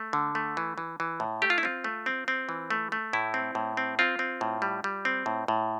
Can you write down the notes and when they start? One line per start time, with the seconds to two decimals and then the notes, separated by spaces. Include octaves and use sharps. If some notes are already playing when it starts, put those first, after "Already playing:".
Already playing: A3
0.13 D3
0.35 A3
0.57 E3
0.78 E3
1.00 E3
1.20 A2
1.42 A3 G4
1.50 F4
1.58 E4
1.63 C4 F4
1.84 A3
2.06 C4
2.28 C4
2.49 E3
2.70 A3
2.92 A3
3.13 A2 E4
3.34 C4
3.55 A2
3.77 C4
3.99 C4 F4
4.19 C4
4.41 A2
4.62 G3
4.84 G3
5.05 C4
5.26 A2
5.48 A2